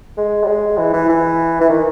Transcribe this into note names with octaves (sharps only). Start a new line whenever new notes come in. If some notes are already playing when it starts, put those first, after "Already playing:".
G#3
G3
G#3
E3
E3
E3
E3
D#3